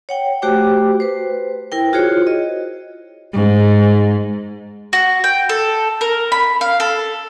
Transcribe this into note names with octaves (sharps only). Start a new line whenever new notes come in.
C#5 F#5 G5
A3 F#4 G4 C5 G5 D6
B4 C5
E4 A#4 G5
F4 F#4 G#4 C5 C#5
D#5
G#2
F#4
G5
A4
A#4
B5
F5
A4